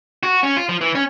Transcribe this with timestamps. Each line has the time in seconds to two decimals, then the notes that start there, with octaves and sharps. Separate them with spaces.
0.23 F#4
0.43 C#4
0.56 F4
0.69 F3
0.81 E3
0.95 C#4